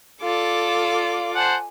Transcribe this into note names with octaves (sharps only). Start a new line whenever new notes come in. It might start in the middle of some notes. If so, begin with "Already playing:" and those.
F4 A4 D5 F5 D6
C5 F#5 G#5 A5